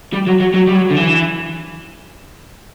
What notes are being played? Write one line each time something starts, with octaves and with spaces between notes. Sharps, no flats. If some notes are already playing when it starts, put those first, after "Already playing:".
G3
F#3
F#3
F#3
G3
F#3
D3
E3